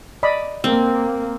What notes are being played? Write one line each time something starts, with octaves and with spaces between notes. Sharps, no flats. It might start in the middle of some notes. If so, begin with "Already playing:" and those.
D5 D#5 B5
A#3 C4